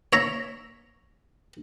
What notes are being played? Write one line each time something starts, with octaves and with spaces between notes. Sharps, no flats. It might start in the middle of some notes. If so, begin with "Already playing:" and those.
C#5 E5 A#5